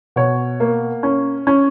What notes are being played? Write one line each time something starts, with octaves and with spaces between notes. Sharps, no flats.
B2 C#5
A#3
C#4
C#4